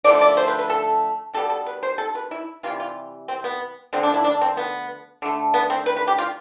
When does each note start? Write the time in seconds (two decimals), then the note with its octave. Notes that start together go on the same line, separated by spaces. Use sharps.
0.04 D3 F3 A3 D5
0.21 D5
0.37 C5
0.48 B4
0.59 B4
0.70 A4
1.33 B2 G3 B3 A4
1.50 A4
1.66 B4
1.83 C5
1.98 A4
2.15 B4
2.31 E4
2.63 C3 E3 G3 F4
2.80 F4
3.28 C4
3.44 B3
3.93 D3 F3 A3 C4
4.03 D4
4.14 E4
4.24 D4
4.41 C4
4.57 B3
5.22 D3 A3
5.54 B3
5.70 C4
5.86 B4
5.97 B4
6.07 G4
6.18 F4